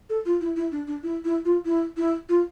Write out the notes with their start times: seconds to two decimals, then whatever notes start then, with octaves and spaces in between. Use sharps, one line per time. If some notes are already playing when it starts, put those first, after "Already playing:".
0.10 A4
0.25 F4
0.41 E4
0.56 E4
0.72 D4
0.87 D4
1.03 E4
1.25 E4
1.45 F4
1.65 E4
1.97 E4
2.29 F4